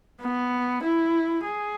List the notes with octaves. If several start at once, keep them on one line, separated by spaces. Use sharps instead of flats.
B3
E4
G#4